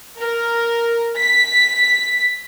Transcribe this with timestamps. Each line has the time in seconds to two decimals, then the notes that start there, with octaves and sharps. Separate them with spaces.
0.19 A#4
1.21 B6